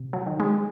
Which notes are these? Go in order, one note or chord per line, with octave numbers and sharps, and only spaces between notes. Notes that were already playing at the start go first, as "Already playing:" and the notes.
Already playing: C3
F#3
D#3
G#3